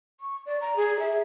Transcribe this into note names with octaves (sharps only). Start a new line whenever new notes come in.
C#6
D5
A#5
G#4
E5